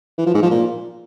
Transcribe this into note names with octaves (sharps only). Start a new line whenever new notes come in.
E3
F3
G#2
F3
A#2